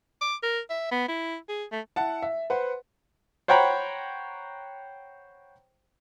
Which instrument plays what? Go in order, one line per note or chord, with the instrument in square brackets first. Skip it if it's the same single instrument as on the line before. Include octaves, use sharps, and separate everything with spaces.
[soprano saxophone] D6
A#4
E5
B3
E4
G#4
A3
[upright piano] E4 F#5 A5
E5
B4 C5 F#5
[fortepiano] C5 C#5 F#5 G5 A#5 B5